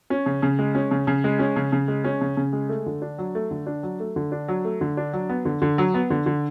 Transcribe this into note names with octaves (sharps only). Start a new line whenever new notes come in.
C#4
C#3
C#3
G#3
C#4
C#3
C#3
G#3
C#4
C#3
C#3
G#3
C#4
C#3
C#3
G#3
A3
D3
D4
F#3
A3
D3
D4
F#3
A3
D3
D4
F#3
A3
D3
D4
F#3
B3
D3
D3
F#3
B3
D3
D3